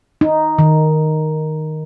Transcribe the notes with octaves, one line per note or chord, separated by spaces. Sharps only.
D#4
D#3